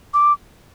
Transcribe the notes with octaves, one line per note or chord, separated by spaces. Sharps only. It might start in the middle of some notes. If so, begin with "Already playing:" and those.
D6